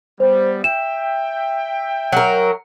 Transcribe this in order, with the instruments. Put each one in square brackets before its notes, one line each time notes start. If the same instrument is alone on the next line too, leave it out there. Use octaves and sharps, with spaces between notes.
[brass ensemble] G3 B3 [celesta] C5
[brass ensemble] E5 G5 [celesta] E7
[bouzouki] F#3 A#4